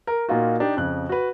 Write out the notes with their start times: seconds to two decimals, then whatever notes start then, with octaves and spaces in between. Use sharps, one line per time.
0.07 A#4
0.29 A#2 A#3 D#4 F4 F#4
0.60 D4 D#4 G4
0.77 F2 C#3 F#6
1.09 F#4 B4